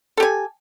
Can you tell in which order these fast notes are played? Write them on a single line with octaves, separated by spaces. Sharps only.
A4 G4 G#5